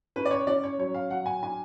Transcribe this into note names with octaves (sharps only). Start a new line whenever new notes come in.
C#4 B4
D5
C#5
C#4 D5
C#5
F#3 C#5
F5
F#3 F#5
G#5
D4 G#5